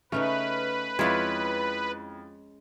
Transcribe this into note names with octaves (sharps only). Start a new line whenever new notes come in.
C#3 A3 C#4 D#4 B4
F2 G#3 C#4 E4 F4 C#5